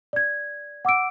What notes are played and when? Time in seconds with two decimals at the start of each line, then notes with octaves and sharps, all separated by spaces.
0.13 D5 G#6
0.85 F#5 D6 E6 D7